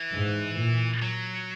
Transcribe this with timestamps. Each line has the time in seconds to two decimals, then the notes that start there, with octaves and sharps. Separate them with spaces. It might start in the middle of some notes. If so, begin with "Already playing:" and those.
Already playing: E3
0.12 G#2
0.58 A#2
1.02 F#3